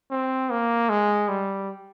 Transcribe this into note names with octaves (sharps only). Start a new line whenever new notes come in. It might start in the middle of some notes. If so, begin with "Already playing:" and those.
C4
A#3
G#3
G3